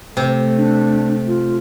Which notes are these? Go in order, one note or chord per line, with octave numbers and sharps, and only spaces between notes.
C3 A3
D4
F4